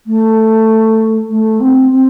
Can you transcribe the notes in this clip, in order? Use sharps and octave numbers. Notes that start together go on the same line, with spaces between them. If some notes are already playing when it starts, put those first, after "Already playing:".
A3
A3
C4
C4